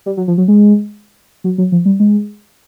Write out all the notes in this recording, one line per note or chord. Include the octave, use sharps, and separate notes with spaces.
G3
F#3
F3
F#3
G#3
F#3
F#3
F3
G3
G#3